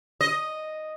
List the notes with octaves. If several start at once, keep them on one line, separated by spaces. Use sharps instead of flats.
D#5